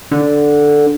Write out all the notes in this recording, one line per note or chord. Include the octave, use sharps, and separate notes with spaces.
D3